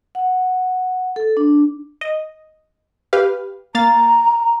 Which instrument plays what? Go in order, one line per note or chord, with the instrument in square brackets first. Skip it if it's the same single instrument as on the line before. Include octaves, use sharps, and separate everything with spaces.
[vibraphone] F#5
A4
D4
[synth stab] D#5
G4 B4 F5
[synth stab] A#3 F5 A6 [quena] A#5